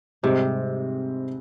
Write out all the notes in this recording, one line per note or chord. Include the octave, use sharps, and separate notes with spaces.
G#2 C3 G3 C4 D#4